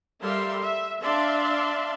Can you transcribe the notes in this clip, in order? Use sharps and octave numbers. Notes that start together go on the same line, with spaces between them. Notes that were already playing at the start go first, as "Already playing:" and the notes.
G3 A4 A#4 E5 F5 C6
E5
D4 D5 E5 F5 C6